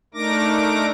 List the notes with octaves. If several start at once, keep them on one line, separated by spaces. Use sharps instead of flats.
A3 D4 D#4 A#4 D6 A#6